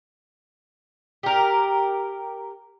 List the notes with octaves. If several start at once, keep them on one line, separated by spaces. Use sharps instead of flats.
G4 A#4